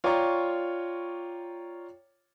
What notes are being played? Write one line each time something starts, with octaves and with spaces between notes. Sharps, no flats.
F4 C#5 D5 G5 A#5 C#6